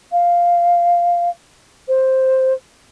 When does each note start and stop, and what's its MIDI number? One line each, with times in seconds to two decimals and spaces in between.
0.12 1.29 77
1.88 2.53 72